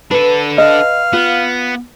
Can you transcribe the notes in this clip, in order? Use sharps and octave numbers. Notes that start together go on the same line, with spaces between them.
D4 A4 B4
D#5 F5
B3 F4